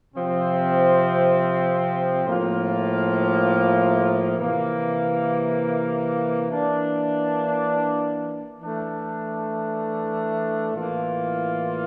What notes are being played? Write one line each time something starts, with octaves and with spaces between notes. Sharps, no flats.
C3 F3 C4
A2 F3 A#3 F4
C3 E3 A#3
E3 A#3 D4
E3 A3 D4
A2 E3 A#3 F4